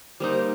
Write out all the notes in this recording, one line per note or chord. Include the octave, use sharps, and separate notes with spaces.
G3 A#3 D#4 C5